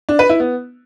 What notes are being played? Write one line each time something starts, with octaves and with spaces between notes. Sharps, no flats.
D4
B4
E4
B3